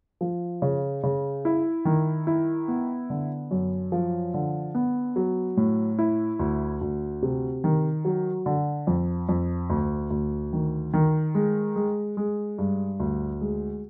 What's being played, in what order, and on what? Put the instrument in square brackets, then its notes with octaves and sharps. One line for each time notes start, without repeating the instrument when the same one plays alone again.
[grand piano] F3
C#3
C#3
E4
D#3
E4
B3
D3
F#2
F3
D3
B3
F#3
A2
E4
D2
D2
C3
D#3
F#3
D3
F2
F2
D2
D2
D#3
D#3
G#3
G#3
G#3
G2
D2
G#3